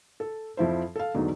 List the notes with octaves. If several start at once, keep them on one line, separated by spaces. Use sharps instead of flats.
A4
F2 F3 E4 C5
A4 F5
E2 G#2 D3 F#3 D#4